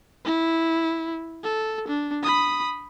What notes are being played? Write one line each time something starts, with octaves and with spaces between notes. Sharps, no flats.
E4
A4
D4
B5 D#6